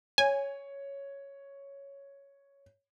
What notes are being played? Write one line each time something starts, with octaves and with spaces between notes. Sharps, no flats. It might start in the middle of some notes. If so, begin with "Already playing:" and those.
C#5 G#5